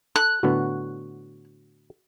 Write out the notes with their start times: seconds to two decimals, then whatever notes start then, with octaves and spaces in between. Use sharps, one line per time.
0.16 A4 F#6
0.43 A2 D3 B3 F#4